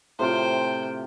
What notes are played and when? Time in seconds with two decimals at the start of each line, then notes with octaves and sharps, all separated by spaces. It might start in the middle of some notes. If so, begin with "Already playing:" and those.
0.19 A2 C3 F4 C5 G5